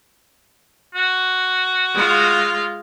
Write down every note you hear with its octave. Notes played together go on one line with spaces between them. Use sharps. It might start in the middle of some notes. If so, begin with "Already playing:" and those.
F#4
G#3 F4